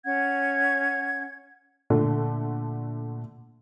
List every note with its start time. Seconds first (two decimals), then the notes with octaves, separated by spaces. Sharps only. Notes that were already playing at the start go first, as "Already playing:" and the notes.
0.04 C#4 F#5 G#6
1.90 A#2 D3 A3